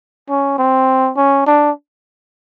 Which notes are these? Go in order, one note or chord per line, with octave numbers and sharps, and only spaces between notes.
C#4
C4
C#4
D4